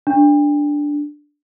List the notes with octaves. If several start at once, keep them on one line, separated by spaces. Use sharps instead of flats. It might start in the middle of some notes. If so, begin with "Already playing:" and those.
D4